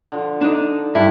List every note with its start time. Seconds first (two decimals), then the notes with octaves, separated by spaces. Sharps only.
0.12 D3 F3
0.41 D4 D#4
0.95 G2 D4 E4 G4 A5